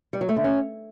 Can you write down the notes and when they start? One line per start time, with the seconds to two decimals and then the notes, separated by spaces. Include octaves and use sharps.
0.13 G3
0.21 F#3
0.29 A3
0.36 D3
0.44 C#4